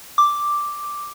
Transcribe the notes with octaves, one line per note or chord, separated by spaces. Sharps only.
D6